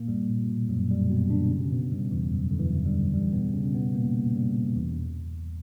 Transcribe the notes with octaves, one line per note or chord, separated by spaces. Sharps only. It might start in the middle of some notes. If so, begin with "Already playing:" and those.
Already playing: A#2 A#3
G2 G3
A#2
B2
F#2 F#3
G2 G3
B2 B3
D3 D4
C#3 C#4
B2 B3
G2 G3
E2 E3
F#2 F#3
D3
E2 E3
G2 G3
G2 G3
B2 B3
C#3 C#4
B2 B3
A#2 A#3
G2 G3
E2 E3